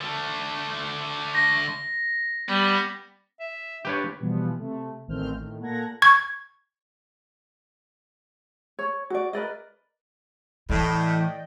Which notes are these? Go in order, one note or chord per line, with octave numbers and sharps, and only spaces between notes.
D3 A3
A#6
G3 B3
E5
D4 G4 B4 C#5
B2 E3 F3 G3 B3
C3 A3
A1 D#3 C4 F6 G6
A2 D#3
A#2 A4 F#5 A#5 G#6 A#6
C#6 G#6
C#5
F#4 D5
A#4 B4 D5 D#5
A2 E3 D5 D#5 G5